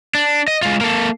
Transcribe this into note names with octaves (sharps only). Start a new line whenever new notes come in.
D4
D#5
G#3 F4
A#3 A4